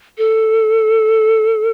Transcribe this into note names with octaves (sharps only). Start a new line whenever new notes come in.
A4